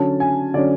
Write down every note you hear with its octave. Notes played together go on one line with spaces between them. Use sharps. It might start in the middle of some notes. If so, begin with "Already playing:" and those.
Already playing: D3 F#3 C#4 A5
G#5
D3 F#3 C#4 D5